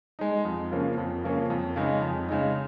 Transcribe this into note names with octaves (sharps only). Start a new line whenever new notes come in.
G#3 D#4
F2
C#3 F3 A#3 C#4
F2
C#3 F3 A#3 C#4
F2
C#3 G#3 D#4
F2
C#3 G#3 D#4